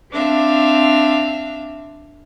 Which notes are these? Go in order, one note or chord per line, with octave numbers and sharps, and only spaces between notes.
C4 D4 E5 F5